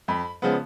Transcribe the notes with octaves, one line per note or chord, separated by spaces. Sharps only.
F2 B5
C#3 F3 G#3 B3